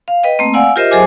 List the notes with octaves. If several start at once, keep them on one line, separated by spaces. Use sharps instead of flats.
F5
B4 D#5 G5
A3 A#3 C4
D5 F5 F#5 G#5 E6
F4 G4 A#4 C5 D#5 E5
F#3 G#4 C5 G#5 D6